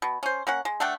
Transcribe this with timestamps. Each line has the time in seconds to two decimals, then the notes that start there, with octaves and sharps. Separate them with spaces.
0.02 B2
0.23 C#4 C5
0.47 A#3 C#4 F#5
0.65 G#3
0.80 A3 D4 F#5 G5